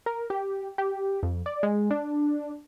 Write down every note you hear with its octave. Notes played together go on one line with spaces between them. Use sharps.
A#4
G4
G4
F2
D5
G#3
D4